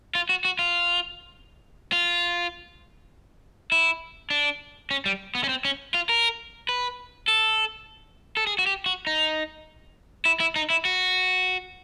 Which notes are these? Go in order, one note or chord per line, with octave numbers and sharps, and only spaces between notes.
F4
F#4
F#4
F4
F4
E4
D4
C#4
G3
B3
C#4
C4
C#4
F4
A#4
B4
A4
A4
G#4
F#4
G4
F#4
D#4
E4
E4
D#4
E4
F#4